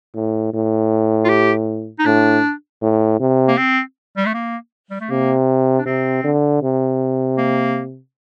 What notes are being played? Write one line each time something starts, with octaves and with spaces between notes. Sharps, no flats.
A2
A2
F4
G4
D#4
A2 D4
A2
C3
A#3
C4
G3
A3
A#3
G3
A3
C3 A#3
D4
C3 C4
D3
C3
A#3